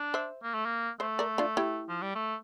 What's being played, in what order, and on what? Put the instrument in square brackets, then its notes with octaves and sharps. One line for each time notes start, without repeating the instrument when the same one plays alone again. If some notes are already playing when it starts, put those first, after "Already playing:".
Already playing: [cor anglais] D4
[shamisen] C5 E5
[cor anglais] A#3
A3
A#3
[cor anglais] A3 [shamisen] C5 E5
[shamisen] A#4 D5
D4 F4
E4 G4
[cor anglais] F3
G3
A3